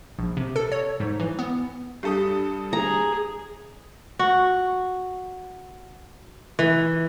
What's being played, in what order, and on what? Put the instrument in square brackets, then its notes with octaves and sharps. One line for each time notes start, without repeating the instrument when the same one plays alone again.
[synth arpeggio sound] A#1
C3
A4
C#5
G#2
E3
B3
[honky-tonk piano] G2 A4 D#6 [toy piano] G4 F5
[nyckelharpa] G#4 [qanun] A#5
[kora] F#4
E3